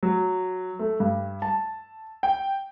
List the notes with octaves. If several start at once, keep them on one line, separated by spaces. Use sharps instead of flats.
F#3
A3
G2
A5
G5